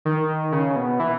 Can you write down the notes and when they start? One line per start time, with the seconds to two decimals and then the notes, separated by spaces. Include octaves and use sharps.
0.05 D#3
0.52 C#3
0.76 B2
1.00 E3